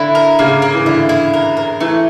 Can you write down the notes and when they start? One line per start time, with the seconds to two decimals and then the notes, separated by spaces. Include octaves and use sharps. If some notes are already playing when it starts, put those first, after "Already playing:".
Already playing: D3 E4
0.15 A#4
0.39 C#3 A#3
0.62 A#3
0.74 E3
0.86 D3 E4
1.09 E4
1.34 A#4
1.57 A#4
1.80 E3 A3